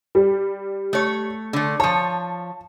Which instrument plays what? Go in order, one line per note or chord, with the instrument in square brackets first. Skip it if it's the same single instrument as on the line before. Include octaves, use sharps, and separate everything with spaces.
[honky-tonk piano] G3
[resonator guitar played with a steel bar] A3 C#5
D3 A3
[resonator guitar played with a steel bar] F3 C#5 [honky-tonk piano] A5